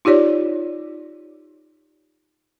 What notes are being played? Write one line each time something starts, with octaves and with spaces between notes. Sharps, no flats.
D#4 F4 G4 C#5 D5